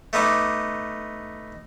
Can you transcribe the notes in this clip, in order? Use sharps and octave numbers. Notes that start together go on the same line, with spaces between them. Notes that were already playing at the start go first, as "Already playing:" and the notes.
A3 B3 D#4 D6